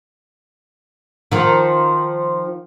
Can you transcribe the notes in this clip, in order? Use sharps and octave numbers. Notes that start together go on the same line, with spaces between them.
D#3 F3